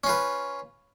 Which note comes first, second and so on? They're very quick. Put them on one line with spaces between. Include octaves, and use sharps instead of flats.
C#4 F4 B4